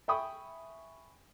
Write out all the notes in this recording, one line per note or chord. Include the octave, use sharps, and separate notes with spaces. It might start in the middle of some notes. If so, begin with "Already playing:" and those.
E5 G5 G#5 B5 C#6 D#6